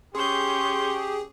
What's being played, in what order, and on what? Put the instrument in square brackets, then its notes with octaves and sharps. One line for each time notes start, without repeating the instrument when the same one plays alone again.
[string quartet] C#4 C#6 G6 [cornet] G4 [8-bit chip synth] G#4 [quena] C6